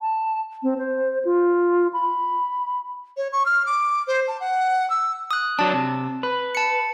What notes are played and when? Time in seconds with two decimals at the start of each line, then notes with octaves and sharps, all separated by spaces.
0.01 A5
0.63 C4
0.78 C5
1.25 F4
1.93 B5
3.16 C#5
3.32 C#6
3.45 F6
3.65 D6
4.07 C5
4.27 A5
4.40 F#5
4.89 E6
5.31 D#6 F#6
5.59 F#3 D4 A5
5.73 C3
6.23 B4
6.55 A5 C#7